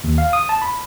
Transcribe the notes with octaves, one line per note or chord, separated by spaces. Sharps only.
D#2
F5
D#6
A5
B5